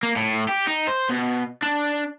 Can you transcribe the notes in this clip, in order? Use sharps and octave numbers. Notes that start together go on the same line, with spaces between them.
A#3
A2
G4
D#4
C5
B2
D4